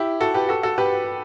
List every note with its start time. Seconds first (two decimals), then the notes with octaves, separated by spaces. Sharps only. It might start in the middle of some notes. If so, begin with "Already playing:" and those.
Already playing: E4 G4
0.20 F#4 A4
0.34 G4 B4
0.49 F#4 A4
0.63 F#4 A4
0.78 G4 B4